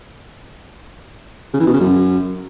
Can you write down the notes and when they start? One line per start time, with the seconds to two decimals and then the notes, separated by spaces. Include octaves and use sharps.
1.53 C#3
1.60 E3
1.67 B2
1.74 C#3
1.80 F#2